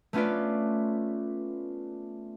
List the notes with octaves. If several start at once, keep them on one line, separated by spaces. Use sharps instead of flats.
A3 B3 C#4 F4 B4 D5